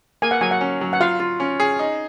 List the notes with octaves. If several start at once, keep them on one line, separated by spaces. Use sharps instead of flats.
A#3 G#5
F#5
F#3 G#5
F#5
C#4
F#3
F#5
F4 F5
F4
C#4
G#4
D#4